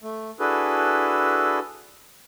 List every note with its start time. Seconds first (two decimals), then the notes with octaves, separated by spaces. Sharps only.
0.02 A3
0.40 D4 E4 F#4 G#4 A4 B4